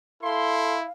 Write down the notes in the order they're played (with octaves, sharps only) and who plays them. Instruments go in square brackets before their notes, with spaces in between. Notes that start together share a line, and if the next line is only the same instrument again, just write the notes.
[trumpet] E4 [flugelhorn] A4 [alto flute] F5 [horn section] C6